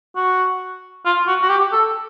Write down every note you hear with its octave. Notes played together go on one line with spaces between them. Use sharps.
F#4
F4
F#4
F#4
G4
A4